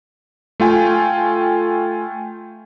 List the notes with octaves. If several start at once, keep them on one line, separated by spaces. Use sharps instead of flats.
A3 F4 G5 G#5